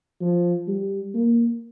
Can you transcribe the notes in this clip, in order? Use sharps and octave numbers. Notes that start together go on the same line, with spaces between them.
F3
G3
A#3